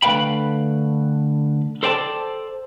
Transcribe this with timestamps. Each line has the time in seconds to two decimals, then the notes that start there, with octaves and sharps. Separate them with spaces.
0.02 D3 A3 B4 F5 G5 B5
1.83 A4 C5 D5 G5 A5